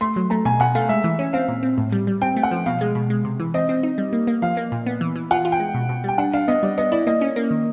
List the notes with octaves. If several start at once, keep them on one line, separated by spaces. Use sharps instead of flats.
A3 C6
F#3
A3 A#5
B2 G#5
B2 F#5
A3 F5
G#3 E5
E3
C#4
C4 F5
A#2
C4
A2
G3
G3
C4 G5
A3
F#5
F3
B2 F5
G#3
B2
G#3
C3
E3
C4 D#5
C4
D#4
G3
A#3
A#3
F3 F5
A#3
A#2
B3
E3
E3
F4 F#5
F4
G5
G#3
B2
B2
G3 G5
D4 F#5
D4 F5
B3 D#5
G3 D5
B3 D#5
E4 D5
A#3 D#5
C#4
A#3
D#3